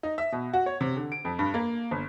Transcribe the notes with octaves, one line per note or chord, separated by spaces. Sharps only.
D#4
E5
B2
F#4
C#5
C3
D3
D7
F2
G2
A#3
G1